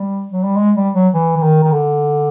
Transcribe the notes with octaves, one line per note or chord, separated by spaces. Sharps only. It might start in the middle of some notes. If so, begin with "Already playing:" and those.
Already playing: G3
F#3
G3
G#3
G3
F#3
E3
E3
D#3
D#3
D3